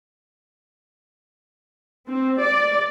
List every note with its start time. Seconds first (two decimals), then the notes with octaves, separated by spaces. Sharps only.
2.06 C4
2.39 D5